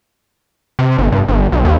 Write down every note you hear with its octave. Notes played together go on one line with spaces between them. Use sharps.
C3
G1
G2
G1
B1
D#2